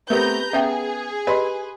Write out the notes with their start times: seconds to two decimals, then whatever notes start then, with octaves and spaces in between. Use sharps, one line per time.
0.10 A3 B3 C4 G4 A#4 B4 A#5 G6
0.53 B3 C#4 G#4 E5 G5
1.27 G4 B4 D#5 C6